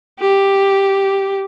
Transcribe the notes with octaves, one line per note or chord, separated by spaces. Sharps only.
G4